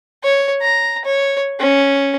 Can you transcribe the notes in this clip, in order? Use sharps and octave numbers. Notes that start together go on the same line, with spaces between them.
C#5
A#5
C#5
C#4